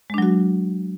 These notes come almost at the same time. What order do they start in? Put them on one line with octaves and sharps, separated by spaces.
G#3 D4 F#3 F#4